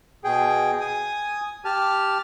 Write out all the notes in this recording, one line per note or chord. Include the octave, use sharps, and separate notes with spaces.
B2 G#4 G5
G#5 D#6
G4 A5 F6